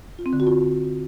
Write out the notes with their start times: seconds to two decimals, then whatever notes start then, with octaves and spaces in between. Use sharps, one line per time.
0.19 F4
0.26 C4
0.33 D3
0.40 F#4
0.47 F4